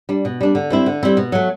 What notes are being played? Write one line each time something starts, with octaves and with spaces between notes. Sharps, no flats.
G3 D4
B2
G3 D4
D3
G3 C4 E4
D3
G3 C4 E4
B2
F#3 A3